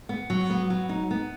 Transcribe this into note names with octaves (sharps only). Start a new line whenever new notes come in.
B3
F#3
B3
F#3
D#4
B3